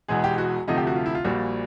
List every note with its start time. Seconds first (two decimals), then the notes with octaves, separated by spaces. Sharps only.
0.08 E1 E2 B2 G#3 G#4
0.24 G4
0.38 F#4
0.68 D2 C3 F3 A3 D#4
0.77 G4
0.87 F#4
0.95 F4
1.06 E4
1.15 F4
1.24 A#1 A#2 G3 F#4